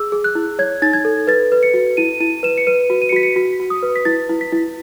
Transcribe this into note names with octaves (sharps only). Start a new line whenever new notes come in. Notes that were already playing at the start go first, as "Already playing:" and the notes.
Already playing: G#4 E6
G#4
F#6
E4
C#5 G#6
D#4 A6
G#6
A4
B4 A6
B4
C#7
F#4
E4 D#7
E4 D#7
B4 E7
C#7
B4 D#7
F#4
D#7
C#7
F#4 B6
C#7
F#4 B6
F#4
D#6
B4
B6
E4 A6
E4
B6
E4